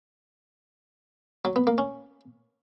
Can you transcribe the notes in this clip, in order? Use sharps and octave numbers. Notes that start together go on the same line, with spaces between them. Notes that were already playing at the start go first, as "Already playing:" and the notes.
F#3
B3
A#3
C#4